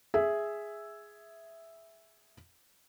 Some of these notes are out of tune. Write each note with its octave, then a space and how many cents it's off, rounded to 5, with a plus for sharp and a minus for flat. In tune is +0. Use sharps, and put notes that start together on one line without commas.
G#4 +0 E5 +0